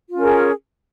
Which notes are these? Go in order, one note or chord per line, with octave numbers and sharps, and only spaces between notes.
C#4 F4 G#4 A#4